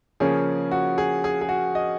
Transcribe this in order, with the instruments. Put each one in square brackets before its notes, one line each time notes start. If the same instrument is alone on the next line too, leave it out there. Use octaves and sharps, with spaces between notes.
[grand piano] C#3 F3 A#3 C#4 G#4
F#4
G#4
G#4
G#4
F#4
D#5